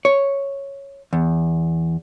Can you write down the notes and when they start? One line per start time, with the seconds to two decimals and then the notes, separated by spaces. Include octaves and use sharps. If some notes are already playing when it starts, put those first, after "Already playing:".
0.05 C#5
1.13 E2